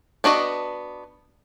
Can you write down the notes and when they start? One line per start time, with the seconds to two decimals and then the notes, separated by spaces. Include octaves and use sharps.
0.24 B3 D4 F#4 D#5